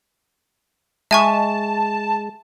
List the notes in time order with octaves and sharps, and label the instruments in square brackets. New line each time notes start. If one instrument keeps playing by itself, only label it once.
[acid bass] G#3 [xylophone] E5 G#5 C#6 [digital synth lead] A5